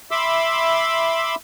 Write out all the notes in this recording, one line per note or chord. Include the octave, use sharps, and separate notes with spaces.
E5 B5 C6 D6 E6